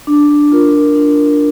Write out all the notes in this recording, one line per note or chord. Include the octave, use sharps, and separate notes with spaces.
D4
F4 A#4
D4